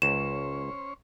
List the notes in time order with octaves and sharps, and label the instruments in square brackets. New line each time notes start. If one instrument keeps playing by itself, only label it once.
[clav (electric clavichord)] C#2 [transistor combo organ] C#4 C5 C#5 [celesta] E7